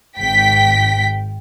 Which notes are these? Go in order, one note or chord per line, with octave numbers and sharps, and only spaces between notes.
G#1 G5 B6